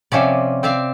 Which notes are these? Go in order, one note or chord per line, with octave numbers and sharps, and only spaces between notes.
C3 F3 C#4 D5
C4 D5 E5 F5